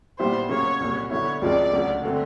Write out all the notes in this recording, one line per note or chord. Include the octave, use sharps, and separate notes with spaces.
A#2 G3 B3 E4 C5
C#3 F#3 A#3 C#5
C2 A#2 F#3
D3 F#3 B3 E4 C#5
C#2 C#3 F3 G#3 C4 D5
D2 C#3 F#3
D3 F#3 A3 C4